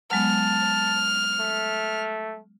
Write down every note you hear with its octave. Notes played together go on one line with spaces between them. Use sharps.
F#3 G#3 B3 A5 F6
A3